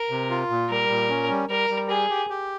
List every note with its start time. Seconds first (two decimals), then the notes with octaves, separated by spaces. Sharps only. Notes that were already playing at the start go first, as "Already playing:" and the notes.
Already playing: A#4
0.10 C3
0.30 F4
0.50 A#2
0.70 G3 A#4
0.89 A#2
1.09 C#4
1.30 G3
1.49 G3 A#4
1.70 G3
1.89 G4 G#4
2.10 G4
2.30 G4